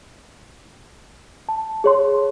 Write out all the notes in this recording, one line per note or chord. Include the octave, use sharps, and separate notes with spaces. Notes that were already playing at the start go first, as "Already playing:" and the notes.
A5
G#4 C#5 C6